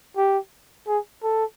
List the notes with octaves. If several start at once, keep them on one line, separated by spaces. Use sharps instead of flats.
G4
G#4
A4